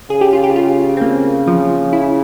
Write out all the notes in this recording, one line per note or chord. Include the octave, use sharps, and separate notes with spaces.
C#3 G#4
G4
F4
G4
F4
C4
A#3
F3
E4